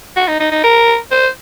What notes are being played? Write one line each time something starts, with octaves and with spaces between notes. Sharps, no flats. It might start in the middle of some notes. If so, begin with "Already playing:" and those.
F#4
D#4
D#4
D#4
A#4
C5